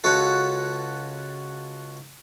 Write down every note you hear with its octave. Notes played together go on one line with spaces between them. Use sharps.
C#2 C#4 F#4 A4